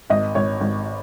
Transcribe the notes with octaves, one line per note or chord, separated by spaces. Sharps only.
G#1 D#5
G#1 C#5
G#1